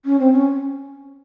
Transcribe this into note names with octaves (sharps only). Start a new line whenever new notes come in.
C#4
C4
C#4